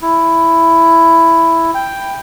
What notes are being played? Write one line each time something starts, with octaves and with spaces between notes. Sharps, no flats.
E4
G5